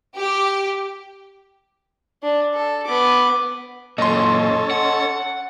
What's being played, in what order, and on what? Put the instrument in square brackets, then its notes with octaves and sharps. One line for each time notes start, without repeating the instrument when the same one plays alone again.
[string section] G4
[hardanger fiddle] D4
A4
B3 D6
[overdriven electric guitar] F#2 A#2 [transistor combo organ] C#4 A4 [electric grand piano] D#5 C6
[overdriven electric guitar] F#5